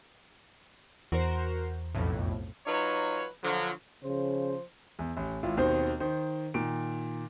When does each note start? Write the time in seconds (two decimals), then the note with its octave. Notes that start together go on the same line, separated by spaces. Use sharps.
1.12 E2 F#4 A#4 C5
1.95 B1 F2 A2
2.67 F#3 D#4 F4 B4 C#5
3.43 D3 F3 F#3
4.04 C#3 F3 C5
4.99 E2
5.17 A1
5.43 G#1 E4 F4
5.57 D#2 B2 D#3 C4 C5
6.00 D#3 C5
6.54 A#2 D#3 D7